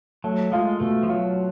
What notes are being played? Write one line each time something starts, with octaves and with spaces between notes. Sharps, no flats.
F#3 A3
G#3 F4
B2 A3
F3
F#3 F4